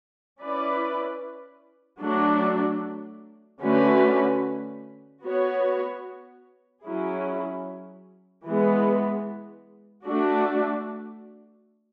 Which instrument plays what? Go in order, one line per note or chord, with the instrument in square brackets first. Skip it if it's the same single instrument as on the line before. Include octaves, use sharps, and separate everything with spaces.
[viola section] C#4 E4 B4 D5
F#3 A3 D4 F#4
D3 A3 C#4 F#4 B4
B3 F#4 C#5
F#3 C#4 E4 G#4
E3 G#3 B3
A3 D4 F#4